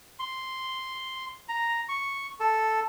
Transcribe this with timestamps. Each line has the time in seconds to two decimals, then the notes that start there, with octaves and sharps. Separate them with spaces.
0.19 C6
1.49 A#5
1.89 C#6
2.40 A4